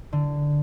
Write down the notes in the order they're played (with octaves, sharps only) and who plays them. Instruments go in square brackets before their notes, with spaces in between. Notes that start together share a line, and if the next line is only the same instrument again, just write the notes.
[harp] D3